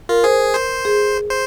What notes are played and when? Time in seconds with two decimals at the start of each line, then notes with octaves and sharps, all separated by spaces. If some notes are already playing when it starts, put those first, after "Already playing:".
0.09 F4 A#4
0.23 G#4 C5
0.54 C5
0.85 G#4
1.30 C5